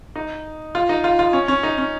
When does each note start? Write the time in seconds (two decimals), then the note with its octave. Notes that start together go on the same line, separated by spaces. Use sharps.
0.16 D#4
0.75 F4
0.89 D#4
1.04 F4
1.19 F4
1.33 C#4
1.48 C#4
1.63 D#4
1.78 C#4